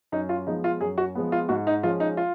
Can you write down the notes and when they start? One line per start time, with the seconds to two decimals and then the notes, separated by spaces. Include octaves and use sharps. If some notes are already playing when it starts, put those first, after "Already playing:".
0.12 F#2 D#4
0.29 F4
0.46 F3 G#3 B3 D#4
0.64 F4
0.81 F#2 G#4
0.98 F#4
1.15 F3 G#3 B3
1.32 F4
1.49 G#2 F#4
1.67 D#4
1.83 F3 G#3 C#4 F4
2.00 D#4
2.17 F4